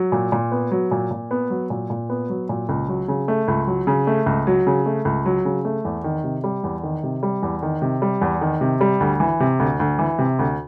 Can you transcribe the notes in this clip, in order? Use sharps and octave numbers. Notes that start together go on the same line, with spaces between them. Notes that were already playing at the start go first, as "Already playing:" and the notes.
Already playing: F#3
A#2
A#2
B3
F#3
A#2
A#2
B3
F#3
A#2
A#2
B3
F#3
A#2
C#2
F#3
C#3
A3
C#2
F#3
C#3
A3
C#2
F#3
C#3
A3
C#2
F#3
C#3
A3
E2
D#3
C3
G3
E2
D#3
C3
G3
E2
D#3
C3
G3
E2
D#3
C3
G3
D2
E3
C3
D2
D2
E3
C3
D2